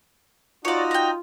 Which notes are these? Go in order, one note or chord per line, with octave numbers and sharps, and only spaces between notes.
D#4 F4 F#4 C#5 D5
G5 A#5